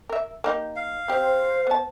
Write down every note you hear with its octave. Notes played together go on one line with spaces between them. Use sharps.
A#4 E5
A#3 D#4 G4
F5
C4 G4 C5
B3 A5